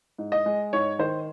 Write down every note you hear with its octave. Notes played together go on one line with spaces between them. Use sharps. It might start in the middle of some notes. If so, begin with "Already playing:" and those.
G#2
D#5
G#3
G#2 C#5
D#3 C5